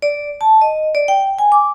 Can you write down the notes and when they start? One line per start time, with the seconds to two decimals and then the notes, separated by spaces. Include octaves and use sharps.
0.02 D5
0.41 A5
0.61 D#5
0.95 D5
1.08 G5
1.39 G#5
1.52 D6